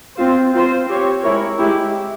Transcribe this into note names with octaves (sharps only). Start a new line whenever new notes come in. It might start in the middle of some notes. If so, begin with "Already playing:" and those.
C4 F4 C5
C4 F4 C5
C4 G4 C#5
G#3 E4 A#4 C#5
G#3 E4 G4